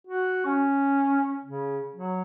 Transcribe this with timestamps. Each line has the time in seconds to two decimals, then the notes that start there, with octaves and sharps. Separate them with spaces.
0.07 F#4
0.45 C#4
1.44 C#3
1.96 F#3